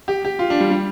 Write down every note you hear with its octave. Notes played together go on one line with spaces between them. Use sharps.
G4
G4
F4
D4
G3
G3